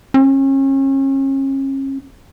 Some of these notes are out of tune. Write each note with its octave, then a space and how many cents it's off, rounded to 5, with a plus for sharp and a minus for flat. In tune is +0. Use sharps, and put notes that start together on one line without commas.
C#4 -35